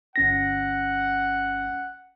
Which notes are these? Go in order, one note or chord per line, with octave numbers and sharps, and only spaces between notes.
G1 C#4 F#5 A#6